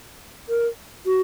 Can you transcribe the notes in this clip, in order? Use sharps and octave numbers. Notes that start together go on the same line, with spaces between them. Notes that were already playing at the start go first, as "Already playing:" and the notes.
A#4
F#4